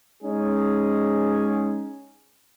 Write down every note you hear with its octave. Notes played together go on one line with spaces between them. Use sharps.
G#3 C#4 D#4 G#4